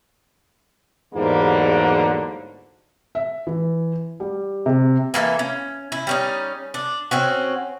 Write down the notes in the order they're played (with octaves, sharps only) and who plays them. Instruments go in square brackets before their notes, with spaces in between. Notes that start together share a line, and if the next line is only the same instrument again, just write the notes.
[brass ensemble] E2 G#2 D3 F#3 G3 A#3
[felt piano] E5
E3
G3
C3
[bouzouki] E3 A#3 A4 E5
C#4
E4
G3 C#4 D#4
D4
C4 C#4 F#4